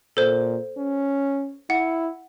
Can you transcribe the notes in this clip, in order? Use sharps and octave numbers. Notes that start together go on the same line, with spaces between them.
A#2 A4 C5
C#4
E4 F#5